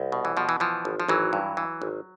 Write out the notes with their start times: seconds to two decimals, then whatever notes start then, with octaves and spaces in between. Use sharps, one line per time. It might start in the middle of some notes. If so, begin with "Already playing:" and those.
Already playing: C2
0.12 B2
0.25 E3
0.37 B2 F3
0.49 E3
0.60 E3 F3
0.85 G#1
1.00 F3
1.08 G#1 E3 F#3
1.33 G2
1.57 E3
1.82 G#1